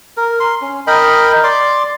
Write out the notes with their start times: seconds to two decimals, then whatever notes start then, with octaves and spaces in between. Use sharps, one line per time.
0.17 A#4
0.40 C6
0.62 C#4
0.87 A#4 D#5 G5 B5
1.44 D5 C6 D6